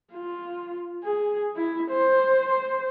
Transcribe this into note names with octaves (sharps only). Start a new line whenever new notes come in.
F4
G#4
E4
C5
C5